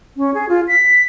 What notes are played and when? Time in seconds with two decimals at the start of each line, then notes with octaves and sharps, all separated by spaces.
0.17 C#4
0.34 G#4
0.49 F4
0.68 B6